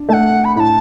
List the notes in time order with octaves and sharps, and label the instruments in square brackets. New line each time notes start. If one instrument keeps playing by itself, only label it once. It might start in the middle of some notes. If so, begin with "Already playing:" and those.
Already playing: [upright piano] D4
[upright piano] A3 [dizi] A5
[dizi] F#5
B5
[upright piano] A2 [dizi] B5
[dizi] A5